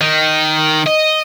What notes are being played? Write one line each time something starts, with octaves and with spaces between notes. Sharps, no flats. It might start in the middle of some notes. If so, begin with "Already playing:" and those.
D#3
D#5